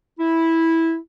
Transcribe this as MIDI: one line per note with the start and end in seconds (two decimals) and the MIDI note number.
0.19 0.97 64